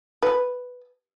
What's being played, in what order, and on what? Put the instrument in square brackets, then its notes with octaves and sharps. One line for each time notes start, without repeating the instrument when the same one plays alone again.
[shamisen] B4